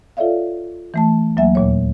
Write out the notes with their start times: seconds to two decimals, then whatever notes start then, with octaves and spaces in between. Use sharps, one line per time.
0.17 F4 A4 C#5 D5 E5 F5
0.94 E3 A3 A5
1.37 D2 F#3 A#3 E5 G#5
1.55 D#2 A#2 C#5